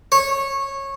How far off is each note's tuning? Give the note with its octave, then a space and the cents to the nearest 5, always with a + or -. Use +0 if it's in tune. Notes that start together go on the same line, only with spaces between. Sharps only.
C#5 -15